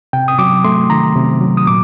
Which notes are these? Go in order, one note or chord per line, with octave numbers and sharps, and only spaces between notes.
C3 G5
D#6
F#3 D6
A3 C6
D#3 A#5
C3
F#3
D#6
A#2 D6